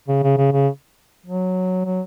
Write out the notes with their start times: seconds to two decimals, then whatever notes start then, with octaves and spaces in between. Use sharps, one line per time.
0.08 C#3
0.23 C#3
0.37 C#3
0.52 C#3
1.26 F#3
1.85 F#3